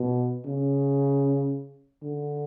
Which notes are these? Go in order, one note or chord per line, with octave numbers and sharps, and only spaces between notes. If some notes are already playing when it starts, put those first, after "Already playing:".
Already playing: B2
C#3
D3